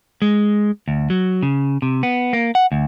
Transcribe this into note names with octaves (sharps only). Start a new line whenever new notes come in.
G#3
D2
F#3
C#3
C3
B3
A#3
F#5
D2